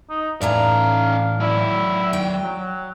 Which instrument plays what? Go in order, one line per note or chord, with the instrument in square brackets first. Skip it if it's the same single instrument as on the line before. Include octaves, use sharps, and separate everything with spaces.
[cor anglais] D#4
[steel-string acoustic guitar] A2 E3 A#5 [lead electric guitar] C#4 D5 [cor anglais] F5
[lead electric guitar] F#3 D5 [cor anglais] E4
[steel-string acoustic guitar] G5
[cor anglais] F#3